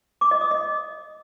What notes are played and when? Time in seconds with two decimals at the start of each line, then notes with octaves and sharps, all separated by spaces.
0.21 D6
0.31 D#5
0.41 D#6
0.51 D#5